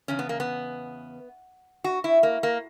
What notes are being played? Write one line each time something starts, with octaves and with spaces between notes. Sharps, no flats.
E2 C#3 C#4
B3
A#3
B3
F#4
E4
A#3
A#3